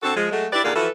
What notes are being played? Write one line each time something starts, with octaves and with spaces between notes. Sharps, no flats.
D3 C4 F#4 A4
F3 G#3
F#3 G#3 A3
E4 G4 B4 D5
D#2 A#2 D3 A#3 G#4 D5
E3 F3 E4 F#4 A4 B4